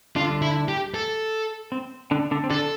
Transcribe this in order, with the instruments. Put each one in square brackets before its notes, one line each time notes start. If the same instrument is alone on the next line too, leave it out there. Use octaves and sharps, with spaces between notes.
[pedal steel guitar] D3 D4 [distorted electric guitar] F4
[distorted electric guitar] E4
G4
A4
[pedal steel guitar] C4
D3 D4
D3 D4
C4
[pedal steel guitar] D3 D4 [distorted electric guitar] A4